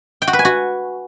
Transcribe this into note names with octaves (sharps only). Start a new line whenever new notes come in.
G5
F#4
B4
G#5
F#4